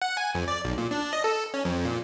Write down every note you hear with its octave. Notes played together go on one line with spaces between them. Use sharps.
F#5
G#5
F2
D5
B1
A#2
D4
D#5
A4
C#4
F2
A#2